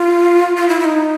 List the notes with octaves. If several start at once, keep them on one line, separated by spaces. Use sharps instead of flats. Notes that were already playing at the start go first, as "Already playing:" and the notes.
Already playing: F4
F4
E4
E4
D#4